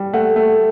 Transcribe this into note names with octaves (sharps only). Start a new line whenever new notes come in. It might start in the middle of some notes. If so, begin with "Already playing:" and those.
Already playing: G3
A3 F#5
A3